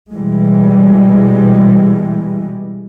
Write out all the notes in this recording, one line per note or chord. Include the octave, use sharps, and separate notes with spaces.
B2 E3 G3 G#3